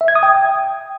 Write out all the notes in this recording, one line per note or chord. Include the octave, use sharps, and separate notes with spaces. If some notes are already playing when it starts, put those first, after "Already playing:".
E5
G#6
D#6
G5